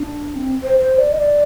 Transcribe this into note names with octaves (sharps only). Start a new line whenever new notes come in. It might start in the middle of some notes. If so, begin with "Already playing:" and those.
Already playing: D4
C4
C5
C5
D5
D#5
D5